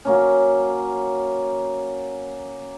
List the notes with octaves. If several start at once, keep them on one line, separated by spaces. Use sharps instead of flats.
F#3 A#3 C#4